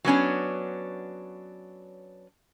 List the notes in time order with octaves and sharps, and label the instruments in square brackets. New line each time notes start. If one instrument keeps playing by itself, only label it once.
[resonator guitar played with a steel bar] F#3 B3 C#4 D4